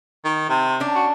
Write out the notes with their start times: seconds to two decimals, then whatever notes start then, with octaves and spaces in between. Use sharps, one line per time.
0.24 D#3
0.49 C3
0.80 C#4 D4
0.95 F#4